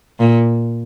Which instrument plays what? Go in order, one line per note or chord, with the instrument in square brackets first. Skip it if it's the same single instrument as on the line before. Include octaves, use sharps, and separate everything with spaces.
[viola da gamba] A#2